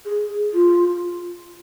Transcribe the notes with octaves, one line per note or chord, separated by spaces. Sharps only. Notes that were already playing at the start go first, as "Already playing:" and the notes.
G#4
G#4
F4